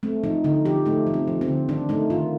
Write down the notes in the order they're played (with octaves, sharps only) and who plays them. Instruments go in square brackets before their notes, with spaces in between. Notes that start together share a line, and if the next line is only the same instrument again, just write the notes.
[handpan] A3 C4
F3 D#4
D3 D#4
F3 G4
A3 D#4
F3
C4
F3
C4
D3
D#3 D4
A3 D#4
D#3 F4